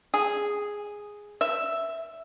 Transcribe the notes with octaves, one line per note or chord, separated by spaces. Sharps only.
G#4
E5